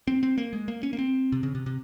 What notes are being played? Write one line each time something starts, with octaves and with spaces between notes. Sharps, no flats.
C4
C4
A#3
G#3
A#3
C#4
A#3
C4
C3
C#3
C3
C3